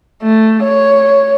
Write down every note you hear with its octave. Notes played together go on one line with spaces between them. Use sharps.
A3
C#5